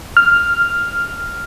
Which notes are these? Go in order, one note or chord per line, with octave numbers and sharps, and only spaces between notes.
F6